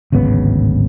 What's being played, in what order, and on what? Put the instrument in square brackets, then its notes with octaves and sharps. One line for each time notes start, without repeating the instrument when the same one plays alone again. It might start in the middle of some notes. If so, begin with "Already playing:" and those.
[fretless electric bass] D1 G#1 C#3 B3